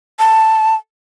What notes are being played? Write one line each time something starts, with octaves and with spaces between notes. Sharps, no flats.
A5